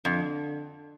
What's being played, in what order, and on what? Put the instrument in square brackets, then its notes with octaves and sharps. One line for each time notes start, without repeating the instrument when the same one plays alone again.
[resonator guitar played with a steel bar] F2 [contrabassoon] D3